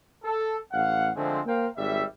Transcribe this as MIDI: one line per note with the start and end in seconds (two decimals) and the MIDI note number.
0.24 0.55 69
0.72 1.09 33
0.72 1.09 77
0.72 1.09 78
1.16 1.39 50
1.16 1.39 53
1.16 1.39 56
1.16 1.39 57
1.16 1.39 60
1.46 1.66 58
1.46 1.66 70
1.46 1.66 72
1.46 1.66 77
1.46 1.66 79
1.76 2.02 32
1.76 2.02 55
1.76 2.02 76